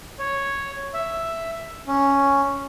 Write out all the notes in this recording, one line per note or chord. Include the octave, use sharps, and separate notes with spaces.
C#5
E5
C#4